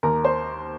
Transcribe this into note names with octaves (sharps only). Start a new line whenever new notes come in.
D#2 A#4
C5